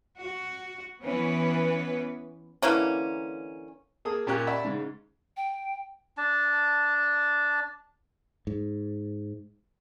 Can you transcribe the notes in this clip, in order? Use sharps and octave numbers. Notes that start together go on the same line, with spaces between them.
F#4
E3 B3 C#4 B4 C#5
D3 E3 A#3 C#4
A#3 G#4 A4 D#6
A#2 C#4 F4 G4 A#4 F#6
D5 E5 F#5 A5 B5
G#2 C#3
G5
D4 A5
G#2